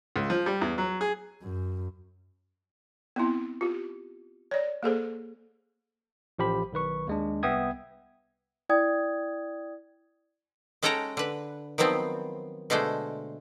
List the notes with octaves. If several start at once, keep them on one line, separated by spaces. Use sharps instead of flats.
C#2
F3
G3
E2
F#3
G#4
F#2
B3 C4 E4
F4 G4
C#5 D5
A#3 G#4 A4 C5
A1 F3 G4 B5
B1 D#3 B4 C#6
D#2 G#3 D4
C2 B3 E5 G5 D#6 G#6
E4 D5 G5 D#6 G#6
G#3 C#4 A4 F#5 G5 A#5
D3 B4
D#3 F3 F#3 B3 C4
B2 D3 G#3 A3 C5